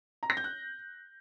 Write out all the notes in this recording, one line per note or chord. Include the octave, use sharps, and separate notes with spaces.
A#5
A#6
G6
F#6